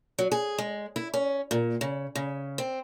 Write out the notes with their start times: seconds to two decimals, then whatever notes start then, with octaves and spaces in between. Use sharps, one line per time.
0.19 F#3
0.32 G#4
0.58 G#3
0.96 E4
1.14 C#4
1.51 A#2
1.81 C#3
2.15 C#3
2.58 C4